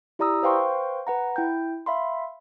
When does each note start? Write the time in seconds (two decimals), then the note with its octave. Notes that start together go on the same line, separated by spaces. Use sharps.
0.19 E4 G4 D5 A#5 D#6 E6
0.43 B4 C5 F5 G5 C6 C#6
1.07 B4 F#5 A#5
1.36 E4 G5 G6
1.86 E5 F5 B5 C6